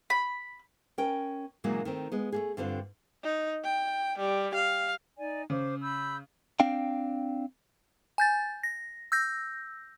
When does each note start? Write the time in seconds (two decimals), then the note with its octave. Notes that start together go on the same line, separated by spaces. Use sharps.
0.10 B5
0.98 C#4 A#4 G5
1.64 A#2 C#3 E3 F#3 G#3 A#3
1.85 D#3 A3 C4
2.12 G#3 B3
2.32 A3 A#3 G#4
2.57 G2 D3 C4 F4
3.23 D#4
3.64 G5
4.19 G3
4.55 F5
5.19 D#4 D5 G#5
5.50 C#3 C5 D6
5.81 B5 E6 G6
6.60 C4 D4 F5 G5
8.18 G#5 G6 A6
8.63 A#6
9.12 E6 G6 A#6